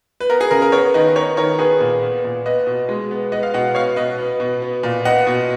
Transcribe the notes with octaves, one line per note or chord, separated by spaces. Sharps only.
B4
B3 A#4
G#4
C#3 A#4
A#4
B3 A#4 C#5
D#3 B4 D#5
B3 A#4 C#5
D#3 A#4 C#5
B3 G#4 B4
A#2
B3
A#2
B3 B4 D#5
B2
G#3
B3
B3 B4 D#5
F5
B2 D#5 F#5
B3 C#5 F5
B2 B4 D#5
B3
B2
B3
A#2
B3 D#5 F#5
B2